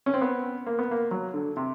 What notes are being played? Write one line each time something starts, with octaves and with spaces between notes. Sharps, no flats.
C#4
C4
B3
A#3
B3
A#3
F#3
D3
C3